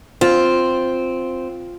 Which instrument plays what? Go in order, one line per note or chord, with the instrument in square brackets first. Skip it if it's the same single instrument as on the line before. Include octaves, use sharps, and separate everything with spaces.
[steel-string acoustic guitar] C4 [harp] F4